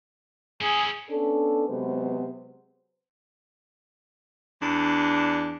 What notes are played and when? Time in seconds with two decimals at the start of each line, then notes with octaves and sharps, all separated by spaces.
0.62 C#4 E4 G#4
1.10 B3 C#4 D4 A4
1.68 C3 F#3 G#3 B3 B4 C5
4.61 E2 D4